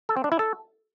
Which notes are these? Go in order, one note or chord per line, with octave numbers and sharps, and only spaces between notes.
A4
C4
D4
E4
A4